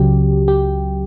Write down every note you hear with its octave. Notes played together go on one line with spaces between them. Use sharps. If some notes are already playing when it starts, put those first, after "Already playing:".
Already playing: C#2 C#3 F#3 G4
G4